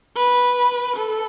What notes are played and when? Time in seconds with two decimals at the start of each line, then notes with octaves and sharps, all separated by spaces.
0.17 B4
0.96 A4